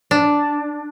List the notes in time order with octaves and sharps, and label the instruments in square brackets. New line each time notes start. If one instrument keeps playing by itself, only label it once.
[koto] D4